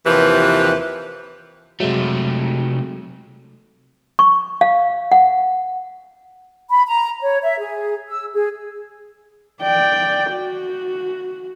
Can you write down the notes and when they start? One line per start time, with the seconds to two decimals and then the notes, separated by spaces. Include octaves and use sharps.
0.06 D#2 C3 E3 F3 G4 B4
1.80 C3 F#3 G#3 A3
4.19 C#6
4.61 F5
5.12 F#5
6.70 B5
6.86 A#5
7.21 C#5
7.42 E5
7.59 G#4
8.08 E6
8.33 G#4
9.62 D5 G5
10.33 F#4